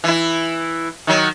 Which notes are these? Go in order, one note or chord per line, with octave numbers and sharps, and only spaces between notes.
E3 E4
D#3 F#3